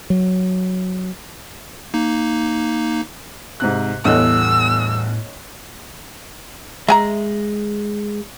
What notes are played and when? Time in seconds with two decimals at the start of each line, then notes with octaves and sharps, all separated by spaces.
0.10 F#3
1.94 A#3 D#4
3.60 G#2 C3 F#6
4.05 G1 E2 A2 C#5 D#5 E6 F#6
6.88 G#3 E5 G#5 A#5